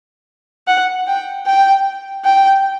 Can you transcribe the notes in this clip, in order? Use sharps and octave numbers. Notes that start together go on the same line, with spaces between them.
F#5
G5
G5
G5